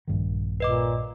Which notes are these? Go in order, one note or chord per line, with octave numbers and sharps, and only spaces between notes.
A#1 G2 D#3
A#2 B4 D#5 D6